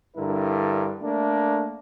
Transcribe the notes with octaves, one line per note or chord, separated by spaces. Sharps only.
G2 D3 E4 A#4
A3 A#3 D4